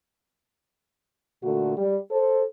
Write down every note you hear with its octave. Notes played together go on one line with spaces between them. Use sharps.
A#2 D3 A3 F#4
G3
A4 C5